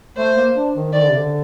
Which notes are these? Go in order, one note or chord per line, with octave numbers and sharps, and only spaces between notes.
A3 C5
A#3
D4
D#3
D#3 D5
D3
C3
D3